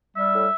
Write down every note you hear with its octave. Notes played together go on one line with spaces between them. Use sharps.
G3 E5
A2